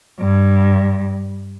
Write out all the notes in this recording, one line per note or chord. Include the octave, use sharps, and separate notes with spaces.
G2